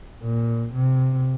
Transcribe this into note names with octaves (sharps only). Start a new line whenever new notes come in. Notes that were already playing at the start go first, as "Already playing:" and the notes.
A#2
C3